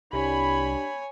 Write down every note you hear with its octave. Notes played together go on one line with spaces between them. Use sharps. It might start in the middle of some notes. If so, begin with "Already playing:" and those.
C2 D4 G4 C#5 G#5 B5